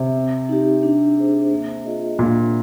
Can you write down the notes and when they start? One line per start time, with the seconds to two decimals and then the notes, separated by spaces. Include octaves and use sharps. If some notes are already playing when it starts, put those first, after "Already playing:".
Already playing: C3
0.16 C4
0.49 D#4 G4
0.83 D4
1.17 G#4 C5
1.51 A#3
1.85 F4 G#4 D#5
2.19 A#2 D4